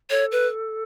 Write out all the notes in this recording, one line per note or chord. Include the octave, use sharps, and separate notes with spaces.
A4 C#5
B4